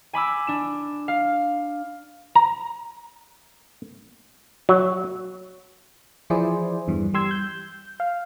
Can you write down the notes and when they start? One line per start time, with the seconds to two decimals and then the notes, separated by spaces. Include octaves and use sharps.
0.13 G#5 B5 D6 E6
0.47 D4 E7
1.08 F5
2.35 A#5
4.69 F#3
6.30 E3 F3 E4 G#4 C5 D5
6.88 E2 G2 E3
7.14 G3 G4 C6 E6 G#6
7.31 G6
8.00 F5